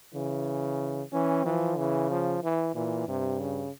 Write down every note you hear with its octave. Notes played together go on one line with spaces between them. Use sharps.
C#3 E3
E3 C#4
E3 F3
C#3 E3
F3
E3
A#2 E3
G2 C3
C#3